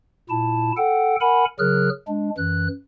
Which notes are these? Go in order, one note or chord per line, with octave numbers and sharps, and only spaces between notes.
A#2 E4 A5
A4 F#5 G5
A#4 F#5 G#5 B5
C#3 F#3 G#4 A#4 F6 F#6
G#3 D4
F#2 E3 F#6